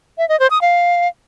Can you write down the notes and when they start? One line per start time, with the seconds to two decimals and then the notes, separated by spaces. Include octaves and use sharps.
0.18 E5
0.29 D#5
0.40 C5
0.51 D#6
0.61 F5